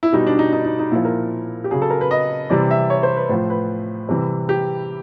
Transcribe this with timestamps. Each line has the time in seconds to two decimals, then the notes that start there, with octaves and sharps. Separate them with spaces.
0.03 E4
0.12 B2 G3 D#4
0.27 D4
0.39 D#4
0.53 D#4
0.65 D#4
0.79 D#4
0.91 A#2 F3 E4
1.05 A#4
1.64 G4
1.71 C#3 F#3 G#4
1.82 A4
1.90 A#4
2.01 B4
2.11 D#5
2.50 C3 E3 G3 D5
2.71 E5
2.90 C#5
3.03 C5
3.17 B4
3.29 A2 F3 C5
3.50 B4
4.09 C3 E3 G3
4.49 G4